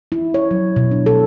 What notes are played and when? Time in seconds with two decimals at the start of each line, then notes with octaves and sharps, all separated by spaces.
0.12 E4
0.34 C#5
0.51 F#3
0.76 B2
0.91 D4
1.06 A4